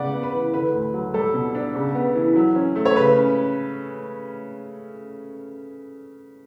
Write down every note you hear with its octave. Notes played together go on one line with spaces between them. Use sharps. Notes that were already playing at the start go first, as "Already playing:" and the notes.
Already playing: C#3 B3 D5 F#5
B3
B4
E3
D3 B4
D2
F#3
G3 A4
B2
D4
C#3
B3
E3
F#3
C#4
A3
C#5
C#3 B4
C#4